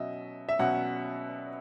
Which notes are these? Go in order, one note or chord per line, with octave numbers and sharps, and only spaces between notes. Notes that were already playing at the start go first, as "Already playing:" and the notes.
Already playing: B2 F#3 C#4 D#5 E5
E5
B2 F#3 C#4 F#5